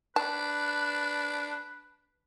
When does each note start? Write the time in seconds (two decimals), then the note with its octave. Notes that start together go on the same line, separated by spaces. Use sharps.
0.16 D4 B4 A5